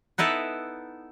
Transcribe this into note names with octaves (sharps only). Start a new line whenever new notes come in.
B3 D#4 E4 A4 B4